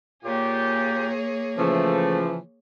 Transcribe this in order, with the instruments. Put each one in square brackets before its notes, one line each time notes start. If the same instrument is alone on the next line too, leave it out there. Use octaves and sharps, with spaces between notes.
[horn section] A#2 F4 G4 [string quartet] A#3 G#4 C#5
[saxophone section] C#3 E3 F3 [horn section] A3